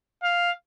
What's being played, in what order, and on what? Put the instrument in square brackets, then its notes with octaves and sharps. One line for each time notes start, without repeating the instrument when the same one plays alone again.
[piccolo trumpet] F5